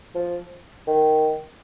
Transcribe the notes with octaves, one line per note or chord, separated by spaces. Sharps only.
F3
D#3